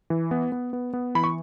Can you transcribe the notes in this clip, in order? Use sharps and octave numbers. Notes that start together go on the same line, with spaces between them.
E3
B3
B3
B3
B3
E3 B5
C#6